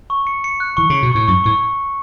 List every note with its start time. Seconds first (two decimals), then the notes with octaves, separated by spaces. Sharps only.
0.10 C#6
0.27 C#7
0.44 C#7
0.60 F#6
0.77 E3 C#6
0.90 C#3 C#7
1.03 B2
1.12 A2 C#6
1.28 F#2 C#6
1.44 A2 C#6